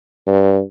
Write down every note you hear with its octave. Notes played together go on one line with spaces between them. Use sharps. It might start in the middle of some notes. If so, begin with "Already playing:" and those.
G2